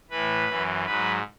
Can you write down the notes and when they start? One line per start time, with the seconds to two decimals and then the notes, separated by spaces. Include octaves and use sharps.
0.10 A2 E3 B4
0.48 F#2 E3
0.85 G#2 F#3 B4